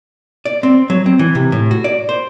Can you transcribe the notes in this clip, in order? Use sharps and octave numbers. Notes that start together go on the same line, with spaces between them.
D5
C4
F#3
C4
E3
C3
A2
F#4
D5
C5